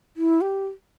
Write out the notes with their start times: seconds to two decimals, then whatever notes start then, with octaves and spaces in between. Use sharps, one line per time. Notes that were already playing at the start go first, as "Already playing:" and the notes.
0.17 E4
0.41 G4